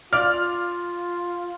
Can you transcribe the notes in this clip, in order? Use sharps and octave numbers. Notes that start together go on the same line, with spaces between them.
F4 D5 F6